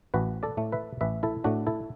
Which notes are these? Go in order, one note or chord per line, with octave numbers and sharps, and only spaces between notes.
A1 F#4 B4
A4 D5
A2 A3
B4 E5
A1 B4 E5
E4 A4
A2 A3 D4 F#4
E4 A4